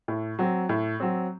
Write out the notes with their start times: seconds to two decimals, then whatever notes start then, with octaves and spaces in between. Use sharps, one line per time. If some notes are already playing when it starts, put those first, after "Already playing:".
0.08 A2
0.39 F#3 C4
0.69 A2
1.00 F#3 C4